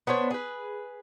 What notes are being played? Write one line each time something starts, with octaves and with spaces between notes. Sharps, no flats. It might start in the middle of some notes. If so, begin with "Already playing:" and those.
B3 D4 C5 C#5
G#4 B4